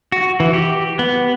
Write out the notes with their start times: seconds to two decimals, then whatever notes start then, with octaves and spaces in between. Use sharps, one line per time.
0.12 F#4
0.40 E3
0.54 G4
0.99 B3